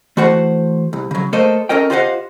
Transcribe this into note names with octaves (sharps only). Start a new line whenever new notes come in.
E3 A3 F#4 C5 F#5
C2
C#3 F#3
A3 A#3 A4 C5 D#5
C#4 A4 A#4 D#5 G5
F4 G4 C5 D#5 F5 F#5